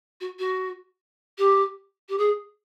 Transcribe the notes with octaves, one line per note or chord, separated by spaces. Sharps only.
F#4
F#4
G4
G4
G#4